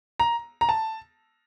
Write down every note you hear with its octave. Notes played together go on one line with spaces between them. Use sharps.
A#5
A#5
A5